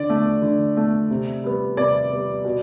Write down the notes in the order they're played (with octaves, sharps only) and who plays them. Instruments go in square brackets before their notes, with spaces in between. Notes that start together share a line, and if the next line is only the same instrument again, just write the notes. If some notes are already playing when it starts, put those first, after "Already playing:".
Already playing: [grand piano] D3 D5
A3
D3
A3
C3
G3 B3
C3 D5
G3 B3
B2